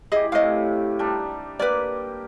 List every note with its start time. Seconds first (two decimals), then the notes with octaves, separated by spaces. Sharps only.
0.12 E4 G4 G#4 D#5
0.32 A2 C3 D#5 F5
0.99 G3 D4 D#4
1.59 A#3 G4 B4 D5